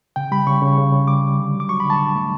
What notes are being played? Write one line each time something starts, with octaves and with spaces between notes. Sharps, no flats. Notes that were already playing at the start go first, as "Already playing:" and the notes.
C#3 G5
G3 B5
C#3 C#6
C#3
C#3
C#3
G3 D6
G3
D3
F#3
D6
F#3 C#6
B5
D3
A5
D3
A3